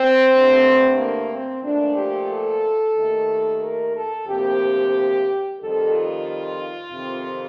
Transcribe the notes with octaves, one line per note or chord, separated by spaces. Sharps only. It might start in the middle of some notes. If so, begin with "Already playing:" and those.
Already playing: C4
G2 D3 A3
A#3
C4
A#2 F3 A3 D4
G4
A4
D#2 D#3 A3
A#4
A4
D2 C3 F3 A#3 G4
F2 D#3 G3 A4
F4
F2 C3 D#3